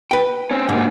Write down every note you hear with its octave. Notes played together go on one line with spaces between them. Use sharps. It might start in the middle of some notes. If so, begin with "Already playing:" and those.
B4 G5
C4 C#4
G#2 D3 A#3